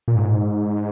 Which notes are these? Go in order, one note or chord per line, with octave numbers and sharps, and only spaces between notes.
A#2
G#2